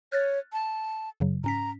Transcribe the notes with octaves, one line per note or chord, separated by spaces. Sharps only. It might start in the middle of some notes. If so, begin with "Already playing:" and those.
C#5 F6 F#6 A6
A5
F#2 C#3 F#3
G#2 C#4 A#5 B6